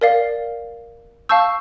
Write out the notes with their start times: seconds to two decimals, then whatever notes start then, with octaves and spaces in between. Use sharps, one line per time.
0.01 A#4 D5 F5
1.29 F5 A5 C#6 E6 G6